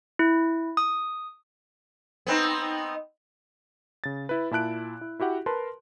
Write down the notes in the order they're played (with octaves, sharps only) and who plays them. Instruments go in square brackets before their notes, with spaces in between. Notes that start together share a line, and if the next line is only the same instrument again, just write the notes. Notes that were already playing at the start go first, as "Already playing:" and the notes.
[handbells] E4
D#6
[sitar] B3 C4 D#4
[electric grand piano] C#3 A6
E4 B4
A#2 E4 A5 F#6 D7
E4
E4 F#4 G4 F#5
A#4 B4 A5 C6